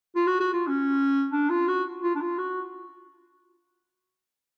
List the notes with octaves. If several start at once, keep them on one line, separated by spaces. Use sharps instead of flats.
F4
F#4
F#4
F4
C#4
D4
F4
F#4
F4
D4
F4
F#4